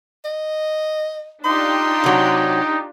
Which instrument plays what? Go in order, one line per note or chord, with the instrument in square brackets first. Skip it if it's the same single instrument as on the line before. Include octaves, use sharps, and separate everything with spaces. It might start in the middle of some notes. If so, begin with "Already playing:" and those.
[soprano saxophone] D#5
[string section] D4 F4 G4 [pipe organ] D#4 [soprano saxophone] C6
[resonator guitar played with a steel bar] C3 F#3